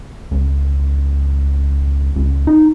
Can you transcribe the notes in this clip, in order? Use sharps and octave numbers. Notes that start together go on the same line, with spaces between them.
C#2
C#2
D#4